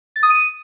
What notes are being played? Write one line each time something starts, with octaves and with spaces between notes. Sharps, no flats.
A6
D#6
D#7